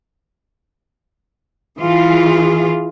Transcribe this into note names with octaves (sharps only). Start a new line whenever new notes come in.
E3 F4 G#4